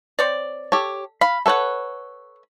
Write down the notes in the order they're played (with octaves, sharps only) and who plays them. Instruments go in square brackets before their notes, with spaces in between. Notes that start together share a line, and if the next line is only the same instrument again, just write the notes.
[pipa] C4 C#5 D5
[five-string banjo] G4 C#5 [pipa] A4
[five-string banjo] F5 [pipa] B5
[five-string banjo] A4 B4 C#5 [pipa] E5 F#5